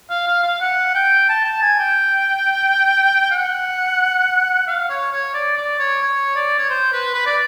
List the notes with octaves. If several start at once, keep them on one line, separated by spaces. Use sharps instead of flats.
F5
F5
F5
F#5
G5
A5
A5
G#5
G5
F#5
F5
C#5
C#5
D5
D5
C#5
C#5
D5
C#5
C5
B4
B4
D5